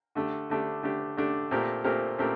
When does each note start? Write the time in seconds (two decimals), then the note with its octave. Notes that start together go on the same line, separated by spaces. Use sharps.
0.15 D3 A3 D4 G4
0.50 D3 A3 D4 G4
0.82 D3 A3 D4 G4
1.17 D3 A3 D4 G4
1.51 A#2 A3 C4 G4 A#4
1.84 A#2 A3 C4 G4 A#4
2.18 A#2 A3 C4 G4 A#4